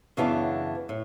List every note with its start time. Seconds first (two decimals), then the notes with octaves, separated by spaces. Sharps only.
0.17 F#2 C#3 E3 B3 D4
0.89 A2